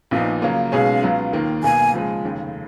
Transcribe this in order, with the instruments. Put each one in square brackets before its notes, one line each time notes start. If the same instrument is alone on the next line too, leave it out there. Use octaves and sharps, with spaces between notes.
[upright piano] A#1 A#2 F3 B3 D#4 [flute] F5
[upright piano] C#3 F#3 A#3 F4
[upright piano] B1 B2 G#3 C#4 G#4 [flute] F5
[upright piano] C#2 C#3 F#3 B3 F4
D#2 D#3 A#3 F4
[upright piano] B1 B2 A#3 [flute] G#5
[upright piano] C#2 C#3 F3 G#3
F1 D#2 C#3